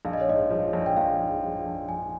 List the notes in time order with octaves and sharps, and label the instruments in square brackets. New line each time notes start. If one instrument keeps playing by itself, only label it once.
[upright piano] A#1 [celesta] F5
[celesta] D#5
C#5
[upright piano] G#2 [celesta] D#5
[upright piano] F3
A#1
[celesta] G5
[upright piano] A#1 [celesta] F5
[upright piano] G#2
F3
A#1
[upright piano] A#1 [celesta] G#5